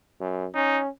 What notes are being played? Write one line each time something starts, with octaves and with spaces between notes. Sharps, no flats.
F#2
C#4 D#4